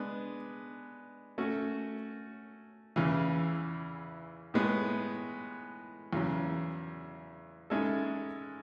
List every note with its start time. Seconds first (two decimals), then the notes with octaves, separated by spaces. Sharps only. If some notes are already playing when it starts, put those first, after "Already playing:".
Already playing: G#3 B3 D4
1.38 A3 C#4 F#4
2.96 E2 C#3 E3
4.54 A2 G#3 B3
6.13 E2 C#3 F#3
7.70 G#2 G#3 C#4 E4 A4